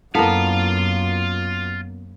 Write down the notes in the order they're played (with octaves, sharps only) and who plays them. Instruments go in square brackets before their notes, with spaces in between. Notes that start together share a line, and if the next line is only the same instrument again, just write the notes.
[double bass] F#2 [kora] A#3 B3 [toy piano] E4 A4 A5 [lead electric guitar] F4 F5